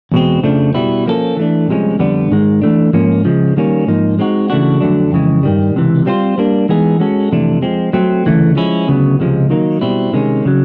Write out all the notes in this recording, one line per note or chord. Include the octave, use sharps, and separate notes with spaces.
E2 B2 G#3 C4
F2 C#3 F3 A3 D4
B2 G3 B3 E4
F3 A#3 C#4 F#4 A4
E3 A3 D4
C2 C3 F3 G#3 C#4
F2 D3 G3 B3 D4
G#2 D#3 G#3
E3 A3 D4
G#2 F3 A#3 C#4
C#3 F3 G#3
D#3 G3 A#3 C#4
G#2 F3 A#3 D#4
G#3 C4 D#4 F#4
C#3 E3 A3 D4 F#4
F2 D3 F#3 A3 D4
F2 C#3 E3 G#3
G2 D#3 G3
C#2 C3 E3
G3 C4 F4 A4 C5
G3 A#3 D4
E3 G#3 B3 D#4 G#4
G#3 C#4 F#4 A4
F2 C3 E3 A3 D4
F3 G#3 C4
F#3 A3 C4
D2 C#3 E3 A3
F3 G#3 C#4 E4
D2 C#3 F#3 B3
C#2 C3 F3 G#3
D#3 F#3 A#3 D#4
B2 G3 C4 E4
C3 D#3 G#3 C#4
C#3 F#3